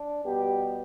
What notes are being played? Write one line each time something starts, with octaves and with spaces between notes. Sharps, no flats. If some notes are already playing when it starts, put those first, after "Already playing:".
Already playing: D4
B2 G3 B3 G4